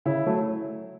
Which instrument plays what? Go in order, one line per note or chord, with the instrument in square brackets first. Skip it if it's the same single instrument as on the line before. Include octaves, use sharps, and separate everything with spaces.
[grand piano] C#3 E4
F#3 A3